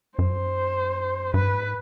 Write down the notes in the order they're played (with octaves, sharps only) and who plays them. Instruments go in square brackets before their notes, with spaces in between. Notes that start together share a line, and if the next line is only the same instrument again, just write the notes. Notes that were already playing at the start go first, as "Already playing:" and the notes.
[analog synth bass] F#2 [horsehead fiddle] C5
[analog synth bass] G2 [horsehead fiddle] B4
[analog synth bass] G#2